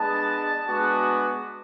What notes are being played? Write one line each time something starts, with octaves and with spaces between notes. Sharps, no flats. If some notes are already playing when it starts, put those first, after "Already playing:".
Already playing: G#3 B3 D4 A5
G#3 B3 D4 F#4